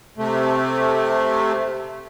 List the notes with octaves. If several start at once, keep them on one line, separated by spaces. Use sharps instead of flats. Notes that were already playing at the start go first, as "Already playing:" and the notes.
C3 A3